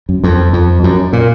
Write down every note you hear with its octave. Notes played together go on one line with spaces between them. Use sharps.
F#2
F2
F2
F#2
A#2